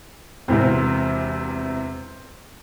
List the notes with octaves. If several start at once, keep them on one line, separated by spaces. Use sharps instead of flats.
E1 E2 C3 C4